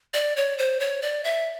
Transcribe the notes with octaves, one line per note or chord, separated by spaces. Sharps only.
D5
C#5
C5
C#5
D5
E5